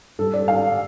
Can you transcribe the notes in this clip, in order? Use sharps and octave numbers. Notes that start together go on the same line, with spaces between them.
G2 G3 A4
D5
F5